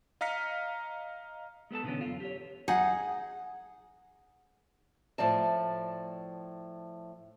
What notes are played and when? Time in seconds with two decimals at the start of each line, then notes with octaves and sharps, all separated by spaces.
0.21 D#5 F5 A#5 F6 B6 C#7
1.71 G#3 B3 A4 A5
1.84 B2 D3 E3 B3 C#4
2.01 F#2 F4
2.20 G4 C#5
2.68 D#4 G#4 F#5
5.18 A2 F3 D5 A5